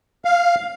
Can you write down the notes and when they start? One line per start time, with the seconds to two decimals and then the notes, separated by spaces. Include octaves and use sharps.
0.25 F5